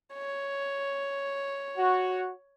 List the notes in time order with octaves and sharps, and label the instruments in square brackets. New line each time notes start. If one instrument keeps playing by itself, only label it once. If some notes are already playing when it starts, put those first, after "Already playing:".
[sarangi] C#5
[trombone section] F#4